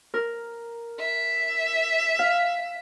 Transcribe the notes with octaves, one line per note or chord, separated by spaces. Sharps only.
A#4
E5
F5